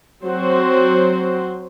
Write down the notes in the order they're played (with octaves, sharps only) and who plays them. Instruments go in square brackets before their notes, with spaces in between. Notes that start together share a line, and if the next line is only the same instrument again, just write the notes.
[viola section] F#3 C4 F#4 C5